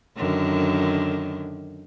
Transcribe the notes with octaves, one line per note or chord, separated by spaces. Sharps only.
F#2 D3 D#3